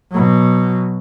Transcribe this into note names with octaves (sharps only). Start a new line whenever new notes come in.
B2 F#3